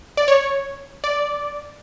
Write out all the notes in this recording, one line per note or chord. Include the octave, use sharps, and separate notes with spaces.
D5
C#5
D5